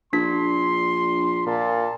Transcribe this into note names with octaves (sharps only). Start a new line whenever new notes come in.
A#1 D4 C6 B6
A#2 A5